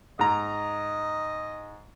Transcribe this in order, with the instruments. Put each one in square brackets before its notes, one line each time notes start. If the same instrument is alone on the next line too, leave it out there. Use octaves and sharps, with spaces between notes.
[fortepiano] G#2 A#5 [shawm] D#5